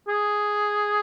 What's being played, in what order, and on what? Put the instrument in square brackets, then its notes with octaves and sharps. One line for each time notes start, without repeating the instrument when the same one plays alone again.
[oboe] G#4